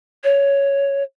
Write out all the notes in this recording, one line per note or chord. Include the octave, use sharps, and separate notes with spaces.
C#5